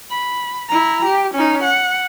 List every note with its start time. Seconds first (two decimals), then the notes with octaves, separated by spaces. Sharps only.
0.10 B5
0.69 E4 A#5
1.05 G4
1.34 C#4 D#4
1.63 F#5